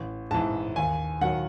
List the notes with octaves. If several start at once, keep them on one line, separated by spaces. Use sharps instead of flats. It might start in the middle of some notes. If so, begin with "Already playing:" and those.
Already playing: A1
G#2 E3 A5
D#2 G#5
D#3 F#3 F#5